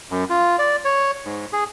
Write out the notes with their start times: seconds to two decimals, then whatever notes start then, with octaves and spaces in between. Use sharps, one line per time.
0.11 F#2
0.30 F4
0.59 D5
0.85 C#5
1.25 G#2
1.53 G#4